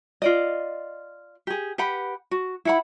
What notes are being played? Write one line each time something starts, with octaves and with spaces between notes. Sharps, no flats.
F4 D5 D#5
G4 G#4
G4 B4 F#5 B5
F#4
E4 F#5 B5